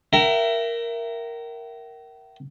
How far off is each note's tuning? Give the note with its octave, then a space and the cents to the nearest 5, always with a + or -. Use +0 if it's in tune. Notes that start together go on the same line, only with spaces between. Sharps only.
A#4 +0 E5 +25 G5 -40